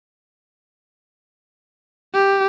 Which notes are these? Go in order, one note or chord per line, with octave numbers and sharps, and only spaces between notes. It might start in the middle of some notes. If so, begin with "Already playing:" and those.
G4